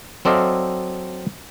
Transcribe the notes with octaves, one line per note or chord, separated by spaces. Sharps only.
F#3 C4 A4 D5 D#5 F5